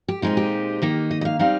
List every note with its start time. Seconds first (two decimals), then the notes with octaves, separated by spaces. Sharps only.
0.08 G4
0.22 A#2 G#3 C4 D#4 F4
0.37 G4
0.82 D#3 A#3 D#4
1.11 D#5
1.21 D#5
1.25 F5
1.39 G3 C4 D#4 F5